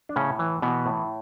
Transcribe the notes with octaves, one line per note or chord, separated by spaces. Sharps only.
D4
A2 C#3 C#4
E3
B2 E3 B3
A2